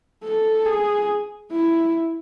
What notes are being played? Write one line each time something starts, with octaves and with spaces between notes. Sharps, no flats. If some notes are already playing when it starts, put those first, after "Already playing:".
A4
G#4
E4